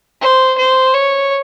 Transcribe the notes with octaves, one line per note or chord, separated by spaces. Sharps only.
C5
C5
C#5